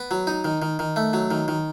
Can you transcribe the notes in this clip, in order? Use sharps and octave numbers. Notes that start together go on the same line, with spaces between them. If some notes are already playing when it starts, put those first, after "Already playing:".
Already playing: B3
F#3
D#4
D#3
D#3
D#3
A3
F#3
D#3
D#3